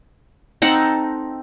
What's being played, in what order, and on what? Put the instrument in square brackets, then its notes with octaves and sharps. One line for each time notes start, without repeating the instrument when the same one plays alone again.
[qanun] C4 D#4 A4 F#5